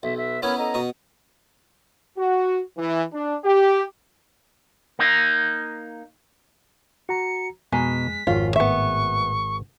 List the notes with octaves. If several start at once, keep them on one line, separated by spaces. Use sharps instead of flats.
B1 E5
B4 E5 E6
B3 C#4 E4 A#4 C#5 B5
A4 D#5 A#5
B2 C#6 D#6
F#4
E3
D4
G4
A#3 D#4
F#4 A#5 C#7
F2 B2 G#3 A#5 B6
G#1 F2 F4 C#5
A2 B3 E5 C#6